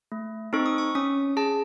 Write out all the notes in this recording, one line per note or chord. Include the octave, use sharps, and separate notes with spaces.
A3
C4 D#4 A4 C#6
D#6
C#6
C#4 D#6
G#4 A5